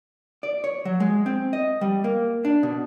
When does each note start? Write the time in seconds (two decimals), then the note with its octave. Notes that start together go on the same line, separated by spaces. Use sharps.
0.43 D5
0.64 C#5
0.85 F#3
1.00 G#3
1.26 C4
1.53 D#5
1.81 G3
2.04 A#3
2.45 D4
2.63 B2